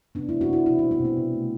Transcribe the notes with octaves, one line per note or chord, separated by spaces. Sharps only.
C3 B3 D4
G3 C4 E4
D4 F#4
C3 C4 E4
B2 C4 E4
C4
G3
C4
B2
B3
C3
A3